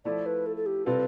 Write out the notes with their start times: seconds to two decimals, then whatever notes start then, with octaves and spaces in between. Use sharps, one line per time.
0.05 F3 A3 E4 D5
0.26 B4
0.46 A4
0.56 A4
0.66 G4
0.86 C3 G3 C4 F4 A4 B4